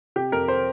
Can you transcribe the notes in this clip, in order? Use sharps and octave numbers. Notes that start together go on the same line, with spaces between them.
C3 G4
F2 A#4
C5